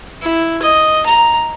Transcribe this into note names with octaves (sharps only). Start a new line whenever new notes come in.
E4
D#5
A#5